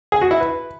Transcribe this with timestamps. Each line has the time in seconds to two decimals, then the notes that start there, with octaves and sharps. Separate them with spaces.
0.12 G#4
0.21 F#4
0.31 E4
0.40 B4